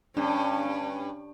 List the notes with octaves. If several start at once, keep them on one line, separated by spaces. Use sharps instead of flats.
G2 C#4 D4